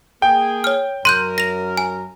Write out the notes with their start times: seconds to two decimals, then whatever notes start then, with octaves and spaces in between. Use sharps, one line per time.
0.22 A#3 G#4 G5
0.64 C#5 F6
1.05 F#2 A#4 C6 F#6 G6 D#7
1.38 A#6 F7
1.77 G#5